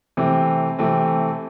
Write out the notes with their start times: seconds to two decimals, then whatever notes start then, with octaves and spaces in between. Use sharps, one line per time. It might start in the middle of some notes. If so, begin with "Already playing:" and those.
0.17 C3 E3 A3 C4
0.78 C3 E3 A3 C4